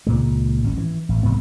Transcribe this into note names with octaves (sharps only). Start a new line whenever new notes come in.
C#2 A#2 G#3
G#1 C#4
E3
A1
F1 C2 G#2 B3